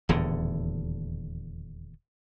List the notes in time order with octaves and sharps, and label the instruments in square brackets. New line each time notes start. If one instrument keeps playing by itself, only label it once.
[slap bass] D#1 E2 A2 D3